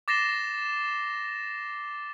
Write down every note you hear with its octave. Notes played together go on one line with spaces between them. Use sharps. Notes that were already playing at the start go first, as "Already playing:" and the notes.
D6 A6 A#6 C7 E7 G7